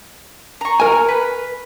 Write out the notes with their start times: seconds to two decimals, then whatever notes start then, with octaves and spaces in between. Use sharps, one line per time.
0.61 A#5 C#6
0.80 A#4 G#5
1.08 B4